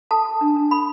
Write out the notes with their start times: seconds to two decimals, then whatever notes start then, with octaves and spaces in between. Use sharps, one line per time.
0.11 A4 A5
0.26 A4
0.41 D4
0.56 D4
0.71 A4 B5